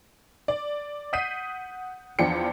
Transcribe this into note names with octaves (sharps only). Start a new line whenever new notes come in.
D5
F#5 D#6 G6 B6 C7 D#7
E2 F3 D4 G5 C#7